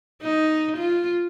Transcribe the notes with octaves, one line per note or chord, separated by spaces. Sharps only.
D#4
F4